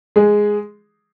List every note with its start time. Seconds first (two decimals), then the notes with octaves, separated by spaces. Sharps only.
0.16 G#3 G#4